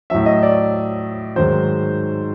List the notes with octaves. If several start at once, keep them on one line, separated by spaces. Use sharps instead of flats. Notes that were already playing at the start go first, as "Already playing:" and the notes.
A2 F#3 E5
D#5
D5
G#2 D#3 F#3 C5